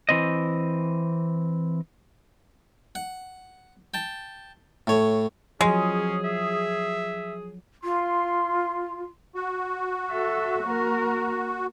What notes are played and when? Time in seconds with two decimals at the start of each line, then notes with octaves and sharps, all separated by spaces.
0.09 E3 C4 D#5
2.95 F#5
3.94 G5 A5
4.87 A2 C#5
5.61 F3 F#3 G#3 C#4 G#4
6.25 E5
7.84 F4 C6
9.35 F#4
10.10 A4 E5
10.63 A#3 A#4